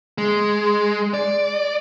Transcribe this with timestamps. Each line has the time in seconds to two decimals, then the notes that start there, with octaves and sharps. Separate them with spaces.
0.18 G#3
1.14 D5